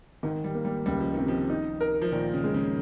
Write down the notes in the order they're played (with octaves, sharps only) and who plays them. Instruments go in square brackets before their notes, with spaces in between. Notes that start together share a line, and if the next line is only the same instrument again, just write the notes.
[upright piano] G#2 [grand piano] D#3
[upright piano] G3
[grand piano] A#3
[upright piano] G3
[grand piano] C#2 [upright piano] G3
[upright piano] F3
[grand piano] C3 [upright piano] D#3
[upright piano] F3
[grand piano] D#4
A#4
[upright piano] F3
[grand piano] A#2 [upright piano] D#3
[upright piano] C#3
[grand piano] G#3
[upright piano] C#3